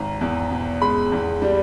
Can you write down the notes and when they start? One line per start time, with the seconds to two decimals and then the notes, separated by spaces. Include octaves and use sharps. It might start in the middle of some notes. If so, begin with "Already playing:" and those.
Already playing: G#1 A#5
0.21 E2
0.51 B2
0.81 G#3 B5
1.12 E2
1.42 G3